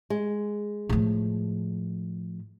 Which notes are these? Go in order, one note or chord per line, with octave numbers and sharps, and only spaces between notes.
G#3
A2 F3